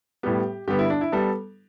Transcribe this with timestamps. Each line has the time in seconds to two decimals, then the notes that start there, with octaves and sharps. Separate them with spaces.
0.23 A2 G3 B3 G4
0.68 G2 D3 G3 B3 G4
0.79 E4
0.90 D4
1.01 E4
1.12 G3 B3 A4